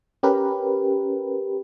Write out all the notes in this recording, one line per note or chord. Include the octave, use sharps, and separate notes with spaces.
C#4 G4 A#4 B4